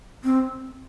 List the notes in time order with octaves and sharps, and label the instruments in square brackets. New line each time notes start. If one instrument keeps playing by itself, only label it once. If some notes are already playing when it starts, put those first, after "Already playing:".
[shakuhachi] C4